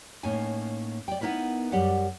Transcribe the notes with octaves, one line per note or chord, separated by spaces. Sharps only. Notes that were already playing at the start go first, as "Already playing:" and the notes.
A2 A#3 C#4 D#4 G#5
D5 G5
B3 D#4 E4 A#4 B4
F#2 G3 G4 D5 F#5